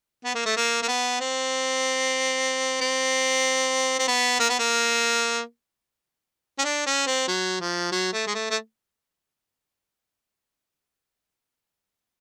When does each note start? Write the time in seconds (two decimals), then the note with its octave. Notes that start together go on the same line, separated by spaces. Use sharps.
0.25 B3
0.35 A#3
0.46 A3
0.57 A#3
0.83 A#3
0.88 B3
1.21 C4
2.81 C4
3.99 C4
4.08 B3
4.40 A#3
4.50 B3
4.59 A#3
6.59 C#4
6.64 D4
6.86 C#4
7.07 C4
7.28 F#3
7.61 F3
7.92 F#3
8.13 A3
8.27 G#3
8.35 A3
8.51 A3